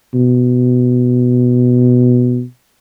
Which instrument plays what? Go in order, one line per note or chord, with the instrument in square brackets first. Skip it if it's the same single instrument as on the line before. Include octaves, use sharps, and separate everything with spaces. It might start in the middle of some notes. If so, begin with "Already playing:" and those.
[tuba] B2